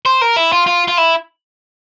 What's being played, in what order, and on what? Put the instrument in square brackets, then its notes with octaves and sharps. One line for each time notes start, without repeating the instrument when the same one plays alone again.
[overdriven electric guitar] C5
A#4
E4
F4
F4
F4
E4